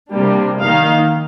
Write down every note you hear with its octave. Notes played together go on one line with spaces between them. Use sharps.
C3 G3 A#3 D4
D#3 A#3 D#4 F5